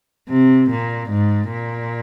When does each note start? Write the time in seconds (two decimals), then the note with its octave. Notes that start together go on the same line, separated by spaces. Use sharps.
0.30 C3
0.70 A#2
1.11 G#2
1.51 A#2